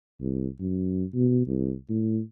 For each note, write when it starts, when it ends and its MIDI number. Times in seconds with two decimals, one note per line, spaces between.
0.21 0.48 36
0.60 1.04 42
1.14 1.44 47
1.47 1.73 36
1.90 2.20 45